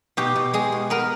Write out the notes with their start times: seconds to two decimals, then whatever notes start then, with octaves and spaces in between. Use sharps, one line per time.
0.17 B2 G4
0.36 B2
0.53 G#3 G#4
0.72 B2
0.90 B3 A#4